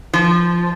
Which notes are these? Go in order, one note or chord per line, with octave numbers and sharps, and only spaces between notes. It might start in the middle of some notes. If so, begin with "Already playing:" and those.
F3